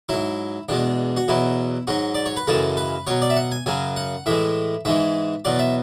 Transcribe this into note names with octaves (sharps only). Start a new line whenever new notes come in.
G#2 F#3 E4
E2 B2 G#3 D4
F#4
E2 B2 F#3 E4
G#2 F#3 F#4
D5
C#5
B4
F#2 C#3 E3 G#3 A4
B4
B2 F#3 C#5
D5
E5
F#5
G#5
F#2 C#3 F#3 G#5
F#5
A2 E3 G#3 E5
G#2 E3 G#3 E5
E2 B2 F#3 D5
E5